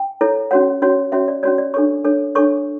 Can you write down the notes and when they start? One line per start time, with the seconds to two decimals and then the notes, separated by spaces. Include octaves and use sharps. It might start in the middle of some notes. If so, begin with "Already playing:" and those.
Already playing: G5
0.21 E4 A4 C#5
0.51 C#4 F#4 C#5 F#5
0.82 C#4 F#4 C#5
1.12 C#4 F#4 C#5 E5
1.28 D5
1.43 C#4 F#4 C#5 D5
1.58 D5
1.74 D4 A4 C#5 C#6
2.04 D4 A4 C#5
2.35 D4 A4 C#5 C#6